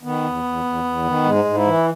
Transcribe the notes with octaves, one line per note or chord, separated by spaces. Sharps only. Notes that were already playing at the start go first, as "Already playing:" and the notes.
D#3 B3
E2
E2
E2
E2
D#3
G#2 G#3
G#2
E4
E3